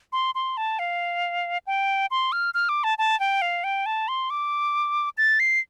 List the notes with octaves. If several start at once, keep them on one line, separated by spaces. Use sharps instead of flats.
C6
C6
A5
F5
G5
C6
F6
F6
D6
A5
A5
G5
F5
G5
A5
C6
D6
A6
C7